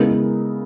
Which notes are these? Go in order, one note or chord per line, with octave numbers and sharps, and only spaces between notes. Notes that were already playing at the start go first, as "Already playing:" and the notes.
Already playing: C#3 G#3 B3 E4 A#4